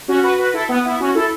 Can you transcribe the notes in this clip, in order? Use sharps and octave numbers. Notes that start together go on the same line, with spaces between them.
C#4 F#4
F#4 B4
F#4 B4
E4 A4
B3
B3 E4
C#4 F#4
E4 A4